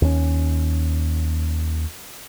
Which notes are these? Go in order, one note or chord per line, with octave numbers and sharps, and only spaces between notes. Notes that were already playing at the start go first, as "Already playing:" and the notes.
D#2 C#4